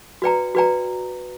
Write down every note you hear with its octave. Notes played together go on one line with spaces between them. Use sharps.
F#4 B4 D5 G5 A#5
F#4 B4 D5 G5 A#5